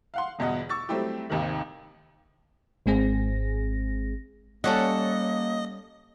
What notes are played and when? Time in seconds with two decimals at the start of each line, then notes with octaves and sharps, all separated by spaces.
0.14 F5 F#5 C6
0.39 G1 E2 B2 D#5 F#5
0.69 C#6 D6 E6 A6
0.89 F#3 G3 A3 C4 E4 G4
1.30 G#1 D#2 C3 D#3
2.86 G#1 G#2 G#3 C4 G#4 A#6
4.64 G3 A#3 C#4 A4 D#5 F#5